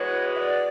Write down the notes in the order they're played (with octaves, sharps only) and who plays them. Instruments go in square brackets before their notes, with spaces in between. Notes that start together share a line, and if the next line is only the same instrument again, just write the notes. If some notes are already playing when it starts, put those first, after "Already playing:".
Already playing: [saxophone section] E3 G#3 B3 F#4 B4 [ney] C#5
[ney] E5
D5